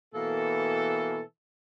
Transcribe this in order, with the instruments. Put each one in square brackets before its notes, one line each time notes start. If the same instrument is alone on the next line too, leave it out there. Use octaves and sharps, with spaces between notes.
[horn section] B2 E3 A#3 A4